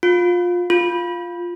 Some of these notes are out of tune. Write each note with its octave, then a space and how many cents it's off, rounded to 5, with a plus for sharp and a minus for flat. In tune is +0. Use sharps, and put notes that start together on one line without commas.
F4 +20
F4 +5